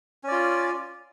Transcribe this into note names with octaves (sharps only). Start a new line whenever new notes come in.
C#4 F4 D5